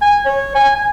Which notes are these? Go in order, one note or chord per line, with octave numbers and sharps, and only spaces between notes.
G#5
C#5
G#5
G#5